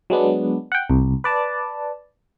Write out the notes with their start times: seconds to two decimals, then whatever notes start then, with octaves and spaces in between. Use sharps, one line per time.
0.10 F#3 G#3 B3 D4
0.72 F#5 G5
0.90 C2
1.24 B4 D5 A5